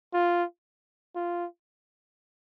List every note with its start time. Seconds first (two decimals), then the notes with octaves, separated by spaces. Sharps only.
0.13 F4
1.15 F4